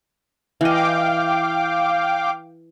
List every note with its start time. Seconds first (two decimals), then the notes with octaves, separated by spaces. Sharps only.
0.61 E3 D#5 F5 G5 D6